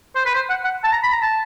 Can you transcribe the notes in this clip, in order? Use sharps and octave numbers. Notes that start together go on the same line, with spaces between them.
C5
B4
C5
F#5
F#5
A5
A#5
B5
A#5
A5